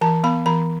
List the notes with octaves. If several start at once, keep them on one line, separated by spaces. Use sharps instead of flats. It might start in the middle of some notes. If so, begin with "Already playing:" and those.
E3 A5
B3 B5
E3 B5